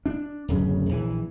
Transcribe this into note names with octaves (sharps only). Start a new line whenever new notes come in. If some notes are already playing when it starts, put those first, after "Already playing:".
D4
D1 F#2 C#3
A#1 E3